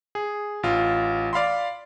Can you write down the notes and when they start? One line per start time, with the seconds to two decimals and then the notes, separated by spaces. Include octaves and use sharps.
0.15 G#4
0.63 A1 F4
1.33 D5 F5 B5 C6